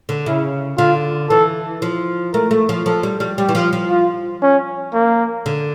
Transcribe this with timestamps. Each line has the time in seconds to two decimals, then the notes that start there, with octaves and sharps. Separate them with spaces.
0.09 D3
0.26 C#3 E4
0.78 D3 F4
1.30 E3 A4
1.82 F3
2.33 A3 A#4
2.51 A3
2.69 F3
2.86 F3 A4
3.03 G3
3.20 G3
3.38 G3 G4
3.49 E3
3.55 F3
3.73 F3
3.90 F4
4.42 C#4
4.94 A#3
5.46 D3